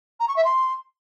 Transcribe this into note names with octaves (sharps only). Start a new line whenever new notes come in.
A#5
C#6
E5
C6